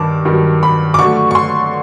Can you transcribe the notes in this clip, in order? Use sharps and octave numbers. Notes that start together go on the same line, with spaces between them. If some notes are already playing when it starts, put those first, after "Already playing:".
Already playing: G2 D#3 A5 D6
G2 D#3 F#3
B5
D6
D3 F#3 A3 C#6
C#6
C6